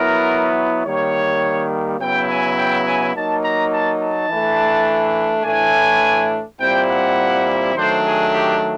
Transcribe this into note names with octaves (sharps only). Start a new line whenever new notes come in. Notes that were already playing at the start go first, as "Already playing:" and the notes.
Already playing: F#3 B3 E4 A#4
D#3 G3 A#3 C#5
C#3 F#3 B3 E4 G5
G#5
G5
G#5
F#3 A#3 D#4 A5
A#5
A5
A5
E3 A3 D4
A2 E3 A3 D4 G#5
A#2 G3 C4 E4 G5
F#5
D#3 F#3 A3 D4 C5
G#4
G4